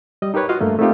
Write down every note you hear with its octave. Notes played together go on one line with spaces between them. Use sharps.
G3 D#5
D#4 G4 A#4 B4 C#5
F4 F#4 D#5 F5 D#6
G2 A3 A#3
A3 A#3 C4 D#4 F4 G4